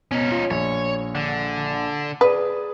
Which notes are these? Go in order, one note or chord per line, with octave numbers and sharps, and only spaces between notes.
B2 C#4 D#4
F4
A#1 C#5
D3
G#4 B4 D5 D#6